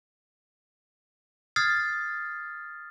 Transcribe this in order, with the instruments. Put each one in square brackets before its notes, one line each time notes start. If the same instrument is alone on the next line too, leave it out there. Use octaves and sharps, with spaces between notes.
[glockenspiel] D#6 F6 G#6 A6 C7